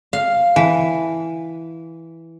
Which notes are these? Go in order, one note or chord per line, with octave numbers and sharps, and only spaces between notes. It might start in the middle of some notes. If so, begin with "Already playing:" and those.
F5
E3